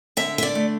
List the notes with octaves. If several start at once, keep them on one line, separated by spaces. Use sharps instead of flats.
D3 E5
E5
D5
A3